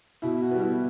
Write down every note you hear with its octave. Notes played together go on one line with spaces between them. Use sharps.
B2 E4
F#4
G3 B3
E4